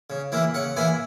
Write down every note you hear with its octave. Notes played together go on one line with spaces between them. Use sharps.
C#3
E3 A#3 E4
C#3 F#5
E3 A#3 E4 G#5